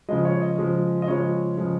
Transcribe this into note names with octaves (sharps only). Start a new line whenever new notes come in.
C#3 F3 G#3 D#5
C#5
D#5
C#3 F3 G#3
D#5
C#3 F3 G#3 C#5
C#3 F3 G#3